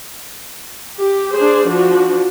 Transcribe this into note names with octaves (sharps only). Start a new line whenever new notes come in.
G4
D4 G#4 C5
F3 D4 F#4